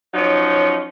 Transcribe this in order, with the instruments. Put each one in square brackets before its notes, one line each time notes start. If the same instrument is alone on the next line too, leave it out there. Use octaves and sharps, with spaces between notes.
[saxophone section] F3 F#3 C#4 D#4